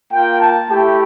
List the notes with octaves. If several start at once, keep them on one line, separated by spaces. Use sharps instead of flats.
A#3 F4 G5
A5
A3 E4 G4 G5